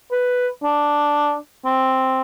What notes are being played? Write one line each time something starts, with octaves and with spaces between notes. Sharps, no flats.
B4
D4
C4